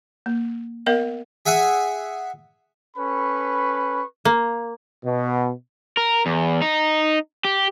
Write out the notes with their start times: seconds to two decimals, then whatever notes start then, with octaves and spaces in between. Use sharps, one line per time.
0.26 A#3
0.86 B3 A#4 D#5 F5
1.46 G#4 E5 F#5 G#5
2.97 C#4 A4 B4 B5 C#6
4.25 A#3
5.05 B2
5.97 A#4
6.26 E2
6.62 D#4
7.44 G4